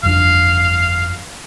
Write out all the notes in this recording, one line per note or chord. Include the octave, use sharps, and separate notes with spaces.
G1 F2 D4 F5